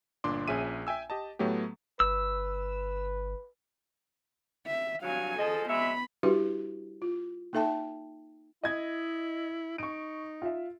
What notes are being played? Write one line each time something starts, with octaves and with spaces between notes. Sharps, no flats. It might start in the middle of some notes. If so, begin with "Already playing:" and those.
G1 A#2 D4 C6 D6
A#1 C#4 G#4 E5 D#7
E5 G5 G#5 E6
G4 D#5 A5
A2 F#3 A3 B3 G4
G1 B4 E6
E5
G2 F#3 F5 G#5
F3 G#4 A4 D#5
F#3 G#3 B3 E5 B5
G3 D4 E4 F#4 G4 B4
F4
A#3 D#4 A4 E5 G5 A5
E4 D#5 G#6
D#4 C#6 D7
F4 E5